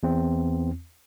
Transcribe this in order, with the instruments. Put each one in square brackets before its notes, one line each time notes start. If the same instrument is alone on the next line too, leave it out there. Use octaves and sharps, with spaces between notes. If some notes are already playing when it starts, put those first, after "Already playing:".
[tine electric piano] E2 C4